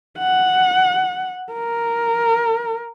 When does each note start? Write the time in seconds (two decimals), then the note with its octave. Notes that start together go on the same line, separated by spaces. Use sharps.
0.19 F#5
1.52 A#4